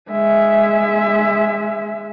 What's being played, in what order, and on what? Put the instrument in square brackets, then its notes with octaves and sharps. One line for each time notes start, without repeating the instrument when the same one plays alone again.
[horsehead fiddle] G#3 E5